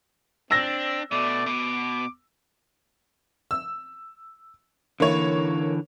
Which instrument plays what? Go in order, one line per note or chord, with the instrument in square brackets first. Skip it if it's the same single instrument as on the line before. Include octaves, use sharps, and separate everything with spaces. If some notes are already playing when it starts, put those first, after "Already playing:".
[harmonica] C4 [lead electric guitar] D4 [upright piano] E6 A#6
[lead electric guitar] B2 [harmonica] A3 D5
[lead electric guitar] B2 [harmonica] D6
[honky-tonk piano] E6
[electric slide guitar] D3 E3 [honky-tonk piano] A#3 C#5